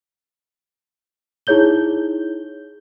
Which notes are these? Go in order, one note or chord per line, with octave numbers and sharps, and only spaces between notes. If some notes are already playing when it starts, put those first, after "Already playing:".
D#4 E4 G#4 C#5 G6 G7